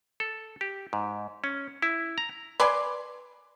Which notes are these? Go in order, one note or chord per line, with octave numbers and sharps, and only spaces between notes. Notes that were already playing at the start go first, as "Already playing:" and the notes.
A4
G4
G#2
C#4
E4
A#5
B4 D5 G#5 C6